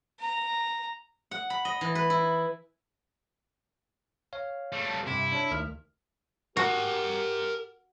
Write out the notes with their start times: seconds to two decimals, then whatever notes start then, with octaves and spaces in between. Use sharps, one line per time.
0.20 A#5
1.31 F#5
1.50 B5
1.65 D#5
1.81 E3
1.95 B4
2.10 E4
4.33 C#5 F5
4.72 G3 A3
5.07 G2 C3 E4
5.32 D4 C#5
5.51 D2 D#3 F6
6.57 F#4 G4 A#4 G#5